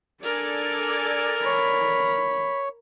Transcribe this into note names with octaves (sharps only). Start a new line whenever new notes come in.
D4 A4 A#4 D5 G#5
C#5 B5